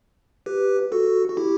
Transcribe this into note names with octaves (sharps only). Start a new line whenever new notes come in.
G4 B4
F#4 A4
F#4
E4 G4